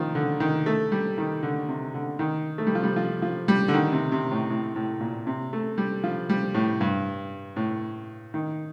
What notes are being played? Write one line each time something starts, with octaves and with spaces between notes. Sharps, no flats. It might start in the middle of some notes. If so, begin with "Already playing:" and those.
Already playing: D#3 F3
D3
D#3
A3
G3
D#3
D3
C3
D3
D#3
A3
G3
F3
G3
F3
F3
G3
D3
D#3
C3
C3
A2
A2
A2
A#2
C3
A3
G3
F3
G3
A2
G2
A2
D#3